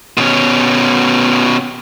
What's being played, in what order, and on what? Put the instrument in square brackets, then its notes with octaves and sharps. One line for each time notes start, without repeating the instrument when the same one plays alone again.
[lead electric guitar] B2 C#4